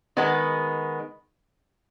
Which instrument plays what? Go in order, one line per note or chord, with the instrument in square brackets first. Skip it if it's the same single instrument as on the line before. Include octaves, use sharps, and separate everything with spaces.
[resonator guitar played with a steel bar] D#3 G#3 B3